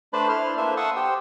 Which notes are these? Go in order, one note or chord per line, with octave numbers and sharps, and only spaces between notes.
A3 D4 B4 C5 A5 B5
D4 E4 C5 C6 F6
A#3 D4 A4 B4 C5 E5
F#5 A5 C6 C#6 D#6 E6
G4 C5 G5